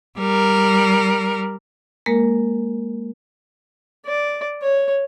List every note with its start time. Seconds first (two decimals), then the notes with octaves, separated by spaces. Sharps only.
0.19 G3 A#4
2.06 G#3 A#3 A#4
4.06 D5
4.62 C#5